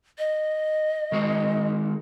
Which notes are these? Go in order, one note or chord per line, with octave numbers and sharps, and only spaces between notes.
D#5
D#3 G#3 F#4